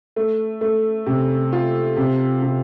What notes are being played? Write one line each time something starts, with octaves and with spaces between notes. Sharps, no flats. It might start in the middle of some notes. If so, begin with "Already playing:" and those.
A3
A3
C3
F4
C3
C3